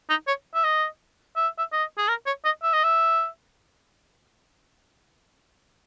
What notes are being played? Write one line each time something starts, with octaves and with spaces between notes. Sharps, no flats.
D#4
C#5
E5
D#5
E5
E5
D#5
G#4
A#4
C#5
D#5
E5
D#5
E5